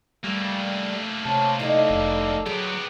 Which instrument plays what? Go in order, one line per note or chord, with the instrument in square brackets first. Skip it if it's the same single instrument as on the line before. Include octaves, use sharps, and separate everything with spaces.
[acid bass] G3 [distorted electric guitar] A3 A#3
[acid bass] C3 [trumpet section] C#5 A5
[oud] D#4 E4 D#5 [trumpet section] A4 D5
[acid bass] F1
[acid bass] F#3 [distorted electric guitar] B3 G4 [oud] G#4